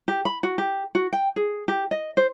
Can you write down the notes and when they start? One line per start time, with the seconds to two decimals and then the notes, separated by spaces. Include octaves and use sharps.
0.08 G4
0.25 B5
0.43 F#4
0.58 G4
0.95 F#4
1.13 G5
1.36 G#4
1.68 G4
1.91 D#5
2.17 C5